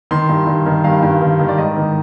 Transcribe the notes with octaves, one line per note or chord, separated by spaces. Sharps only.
D#3 C6
G2
G2
D#3
G2 F5
G2
D#3
D#3
D5
G#2 D#5
D#3